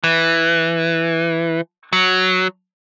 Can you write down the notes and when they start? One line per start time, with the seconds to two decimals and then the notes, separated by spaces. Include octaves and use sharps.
0.04 E3
1.93 F#3